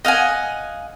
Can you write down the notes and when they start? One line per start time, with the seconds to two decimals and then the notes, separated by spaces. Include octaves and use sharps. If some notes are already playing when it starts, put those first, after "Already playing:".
0.05 D#5 F5 F#5 G#5